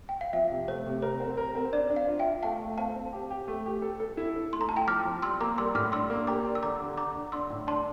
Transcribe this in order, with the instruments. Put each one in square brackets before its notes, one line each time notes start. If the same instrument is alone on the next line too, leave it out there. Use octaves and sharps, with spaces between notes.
[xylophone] G5
F5
[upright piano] F3 [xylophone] E5
[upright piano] C3
[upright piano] A3 [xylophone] C5
[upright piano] C3
[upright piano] A#4 [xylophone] C5
[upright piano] C4
A#4
C4
[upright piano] D4 [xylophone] D5
[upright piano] D4
[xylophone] F5
[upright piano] F4
[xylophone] E5 G5
[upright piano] F4
[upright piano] A3 [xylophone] F5 A5
[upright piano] A3
[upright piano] C4 [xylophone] F5 A5
[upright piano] C4
G4
G4
A3
G4
A4
A4
E4
A4
[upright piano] A3 [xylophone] C6
[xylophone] A#5
[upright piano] E4 [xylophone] A5
[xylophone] G5 A#5
[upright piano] F3 [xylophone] D6 F6
[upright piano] F3
[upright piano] G3 [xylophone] C6 E6
[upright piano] A#3 [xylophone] A#5 D6
[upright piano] G3 [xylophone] C6 E6
[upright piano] A2 [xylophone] D6 F6
[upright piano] D4 [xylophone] C6 E6
[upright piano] A#3
[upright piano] G4 [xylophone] A#5 D6
[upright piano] D5
[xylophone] E6
[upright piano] D3 [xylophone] A#5 D6
[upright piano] D3
[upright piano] D4 [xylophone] A#5 D6
[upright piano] D3
[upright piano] D4 [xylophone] C6 E6
[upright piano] A2
[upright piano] D4 [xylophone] A5 C6